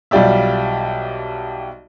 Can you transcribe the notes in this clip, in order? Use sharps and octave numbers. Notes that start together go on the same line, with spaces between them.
B1 G3 F4 G4 D5 E5